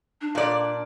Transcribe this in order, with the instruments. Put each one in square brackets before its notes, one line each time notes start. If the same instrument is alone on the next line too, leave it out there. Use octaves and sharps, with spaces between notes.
[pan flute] D4
[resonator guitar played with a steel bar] A#2 D5